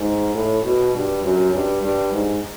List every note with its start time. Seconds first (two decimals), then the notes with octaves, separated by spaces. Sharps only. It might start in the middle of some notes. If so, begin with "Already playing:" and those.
Already playing: G#2
0.34 A2
0.64 B2
0.94 G2
1.23 F#2
1.53 G2
1.83 G2
2.12 G#2